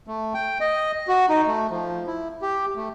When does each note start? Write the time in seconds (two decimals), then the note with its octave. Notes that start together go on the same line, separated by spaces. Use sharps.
0.07 A3
0.34 G5
0.61 D#5
1.08 F#4
1.29 D#4
1.47 A3
1.70 F3
2.07 E4
2.42 G4
2.76 A3